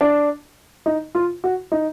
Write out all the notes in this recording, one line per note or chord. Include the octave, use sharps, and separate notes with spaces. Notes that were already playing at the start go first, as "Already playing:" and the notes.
D4
D#4
F4
F#4
D#4